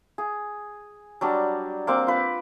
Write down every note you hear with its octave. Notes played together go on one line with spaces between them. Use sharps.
G#4
F#3 G3 D4
A#3 C4 D6
F4 B4